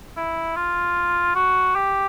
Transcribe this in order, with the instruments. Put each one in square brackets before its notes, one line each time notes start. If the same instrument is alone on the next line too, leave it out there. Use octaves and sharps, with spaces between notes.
[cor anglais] E4
F4
F#4
G4